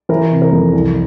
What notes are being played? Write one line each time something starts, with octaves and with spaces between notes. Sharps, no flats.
E3 A#4
C3
A#4
F2
C2